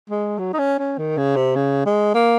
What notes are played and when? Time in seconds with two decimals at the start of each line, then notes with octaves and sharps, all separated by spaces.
0.10 G#3
0.39 F#3
0.53 D#4
0.59 C#4
0.79 C#4
0.98 D#3
1.18 C#3
1.36 C3
1.56 C#3
1.86 G#3
2.15 A#3